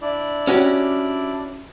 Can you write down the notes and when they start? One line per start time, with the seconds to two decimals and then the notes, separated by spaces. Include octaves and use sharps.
0.02 D4 E4 D5
0.47 C#4 F#4 G4